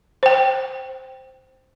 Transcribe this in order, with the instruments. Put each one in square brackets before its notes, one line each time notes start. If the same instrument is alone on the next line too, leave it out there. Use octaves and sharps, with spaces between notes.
[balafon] C5 G5